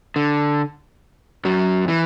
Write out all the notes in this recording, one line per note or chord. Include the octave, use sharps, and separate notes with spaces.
D3
F#2 F#3
E3